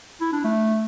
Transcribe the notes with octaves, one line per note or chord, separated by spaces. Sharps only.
E4
D4
A3